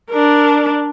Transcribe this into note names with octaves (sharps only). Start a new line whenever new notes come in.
D4 A#4